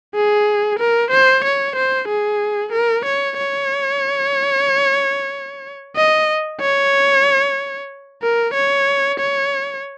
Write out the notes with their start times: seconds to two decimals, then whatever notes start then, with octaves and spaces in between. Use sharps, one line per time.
0.15 G#4
0.79 A#4
1.11 C5
1.44 C#5
1.76 C5
2.08 G#4
2.72 A#4
3.05 C#5
3.38 C#5
5.97 D#5
6.61 C#5
8.22 A#4
8.54 C#5
9.20 C#5